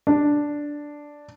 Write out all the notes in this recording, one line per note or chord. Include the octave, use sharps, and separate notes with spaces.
D4